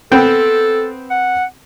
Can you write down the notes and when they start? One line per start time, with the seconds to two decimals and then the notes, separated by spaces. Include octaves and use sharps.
0.12 B3 C4 A4 G5
1.10 F#5